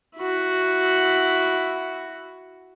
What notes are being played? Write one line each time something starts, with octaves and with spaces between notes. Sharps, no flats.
E4 F#4